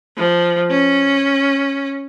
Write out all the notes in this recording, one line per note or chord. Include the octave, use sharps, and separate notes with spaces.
F3
C#4